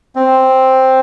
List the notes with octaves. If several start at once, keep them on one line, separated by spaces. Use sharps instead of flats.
C4